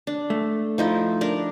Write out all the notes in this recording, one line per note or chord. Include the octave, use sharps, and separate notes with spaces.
D4
A3
F3 D#4 E4
D4 A#4